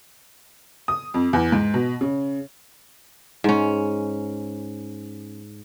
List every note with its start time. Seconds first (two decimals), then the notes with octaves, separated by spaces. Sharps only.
0.88 D#6
1.14 F2
1.33 E2
1.52 G#2
1.74 B2
2.01 C#3
3.44 G#2 C#4